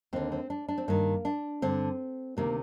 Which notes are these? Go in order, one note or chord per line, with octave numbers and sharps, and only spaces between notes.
D#2 D3 C4
C4
D4
D4
C4
G2 D#3 A#3
D4
G2 D3 C4
D2 C3 D#3 A#3